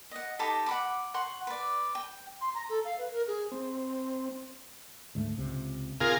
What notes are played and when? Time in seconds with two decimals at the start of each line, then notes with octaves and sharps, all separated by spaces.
0.11 D#5 F#5
0.39 D#4 G4 A4 B5
0.66 F#5 B5 D6
1.14 F#5 C6 C#6
1.47 B4 D5
1.95 G5
2.41 C6
2.54 A#5
2.69 A4
2.85 F5
2.98 B4
3.12 A#4
3.27 G#4
3.52 C4
5.15 D2 G#2 A3
5.38 C#2 C3
6.01 C3 F4 G#4 A#4